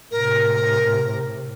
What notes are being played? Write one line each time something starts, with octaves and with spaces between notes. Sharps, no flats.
A2 C3 A#4